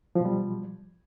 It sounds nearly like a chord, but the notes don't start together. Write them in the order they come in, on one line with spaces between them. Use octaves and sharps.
F3 B2 G3